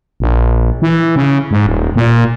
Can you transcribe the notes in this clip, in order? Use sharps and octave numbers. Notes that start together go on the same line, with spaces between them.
A#1
E3
C#3
G#2
D#1
A#2